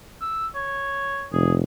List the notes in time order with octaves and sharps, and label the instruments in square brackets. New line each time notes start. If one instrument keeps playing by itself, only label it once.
[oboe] E6
C#5
[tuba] F1 [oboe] G#4